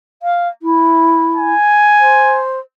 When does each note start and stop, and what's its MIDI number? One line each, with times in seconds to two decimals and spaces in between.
0.22 0.48 77
0.62 1.53 64
1.36 2.43 80
1.99 2.59 72